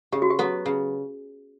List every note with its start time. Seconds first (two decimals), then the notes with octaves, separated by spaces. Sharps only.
0.12 C#3 G4
0.22 F#4
0.30 G4
0.39 F#3 B3
0.66 C#3